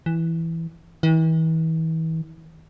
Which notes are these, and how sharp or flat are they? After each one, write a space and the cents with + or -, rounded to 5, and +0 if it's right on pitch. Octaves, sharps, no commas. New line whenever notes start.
E3 +0
E3 -40